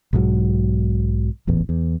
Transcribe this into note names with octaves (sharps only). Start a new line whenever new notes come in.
B1 G#2 F#3
D#1 A1 E2
E2